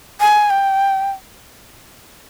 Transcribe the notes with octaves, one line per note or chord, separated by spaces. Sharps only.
G#5
G5